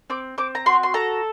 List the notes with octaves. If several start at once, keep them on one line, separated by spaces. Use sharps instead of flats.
C4 D6
C4 D6
A#5
F#4 C6
C6
A4 A#5